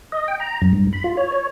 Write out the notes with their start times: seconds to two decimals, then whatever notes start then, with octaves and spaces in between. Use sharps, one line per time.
0.12 D#5
0.28 G5
0.40 A#5
0.62 F#2
0.73 G2
0.93 B5
1.04 F4
1.17 C#5
1.32 C#5